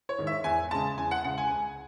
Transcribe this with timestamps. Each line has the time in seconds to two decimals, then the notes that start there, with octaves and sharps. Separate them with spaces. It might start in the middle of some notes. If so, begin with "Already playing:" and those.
0.09 C#5
0.18 G#2 D#3
0.27 E5
0.44 E2 G#5
0.71 C#3 G#3 A5
0.97 E2 G#5
1.11 F#5
1.24 C#3 G#3 F#5
1.38 G#5
1.51 C#2 G#5